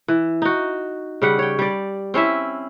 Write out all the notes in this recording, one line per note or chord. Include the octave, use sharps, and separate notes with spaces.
E3
D#4 F#4
C#3 G3 F#5
C#5 G5
G3 D5
C4 C#4 E4 E5